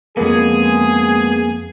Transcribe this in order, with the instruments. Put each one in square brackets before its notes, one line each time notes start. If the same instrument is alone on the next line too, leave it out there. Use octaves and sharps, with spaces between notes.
[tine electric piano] F2 A#3 [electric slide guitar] G#3 B3 [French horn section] G#4